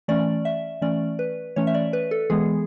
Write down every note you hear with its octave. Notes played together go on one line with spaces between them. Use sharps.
E3 A3 C#4 D5
E5
E3 A3 C#4 D5
B4
E3 A3 C#4 C#5
E5
D5
B4
A4
E3 G#3 B3 G#4